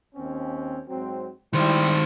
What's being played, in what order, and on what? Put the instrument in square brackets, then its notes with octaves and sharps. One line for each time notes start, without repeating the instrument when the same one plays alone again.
[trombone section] D#2 C4 C#4
G#2 F#3 C4
[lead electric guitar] D#3 C5 [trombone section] G3 E4